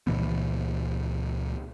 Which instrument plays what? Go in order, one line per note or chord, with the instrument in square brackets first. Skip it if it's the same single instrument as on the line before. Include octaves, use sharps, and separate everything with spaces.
[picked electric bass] C#2 A#2 E3 B3